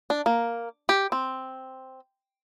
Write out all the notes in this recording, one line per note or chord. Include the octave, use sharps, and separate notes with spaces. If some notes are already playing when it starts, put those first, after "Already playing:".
D4
A#3
G4
C4